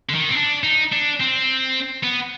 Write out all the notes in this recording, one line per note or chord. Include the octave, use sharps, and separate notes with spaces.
D3
D#3
C4
D4
D#4
D4
C4
B3